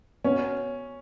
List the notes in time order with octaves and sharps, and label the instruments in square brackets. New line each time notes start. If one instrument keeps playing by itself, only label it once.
[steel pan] B3 [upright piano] C#4